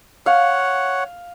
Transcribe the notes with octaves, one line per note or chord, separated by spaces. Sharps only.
C#5 F5 F#5